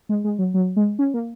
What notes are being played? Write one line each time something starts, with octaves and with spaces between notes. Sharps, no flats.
G#3
G#3
F#3
F#3
G#3
C#4
A#3